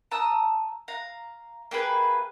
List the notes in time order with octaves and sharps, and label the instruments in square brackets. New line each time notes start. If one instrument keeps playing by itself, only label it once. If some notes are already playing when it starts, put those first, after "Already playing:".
[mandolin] A5 A#5 D#6 E6
F5 A#5
A#3 G4 G#4 B4